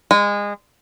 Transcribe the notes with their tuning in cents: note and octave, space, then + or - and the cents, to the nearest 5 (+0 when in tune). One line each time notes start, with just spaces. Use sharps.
G#3 -25